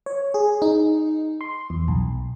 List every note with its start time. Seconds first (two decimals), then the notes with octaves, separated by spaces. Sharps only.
0.06 C#5
0.34 G#4
0.62 D#4
1.41 C6
1.70 E2
1.88 B1